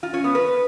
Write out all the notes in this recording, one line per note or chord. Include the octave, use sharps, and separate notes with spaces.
F4
C#4
B3
B4